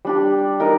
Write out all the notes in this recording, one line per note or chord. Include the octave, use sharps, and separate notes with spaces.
G3 D4 G4
D#4 A#4 D#5